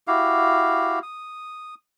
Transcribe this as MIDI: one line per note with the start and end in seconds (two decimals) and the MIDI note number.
0.08 0.99 64
0.08 0.99 66
0.08 0.99 67
0.08 0.99 77
1.03 1.75 87